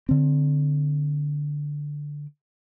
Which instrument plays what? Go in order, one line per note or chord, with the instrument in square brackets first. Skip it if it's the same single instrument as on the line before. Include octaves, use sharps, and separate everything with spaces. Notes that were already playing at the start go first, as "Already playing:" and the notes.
[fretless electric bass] D3 C4